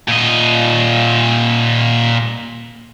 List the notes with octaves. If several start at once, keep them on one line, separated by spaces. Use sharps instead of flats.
A#2 D#5